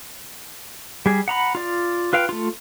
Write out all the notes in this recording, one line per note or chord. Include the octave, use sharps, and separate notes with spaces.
G3 G#4
F#5 A#5 B5
F4 D5
F4 B4 F5 G5
A3 F4